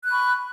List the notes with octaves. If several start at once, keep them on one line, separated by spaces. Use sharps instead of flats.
B5 C#6 F#6